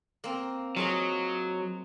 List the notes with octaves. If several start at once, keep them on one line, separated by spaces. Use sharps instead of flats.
A#3 C4
F#3 F4 G#4 D#5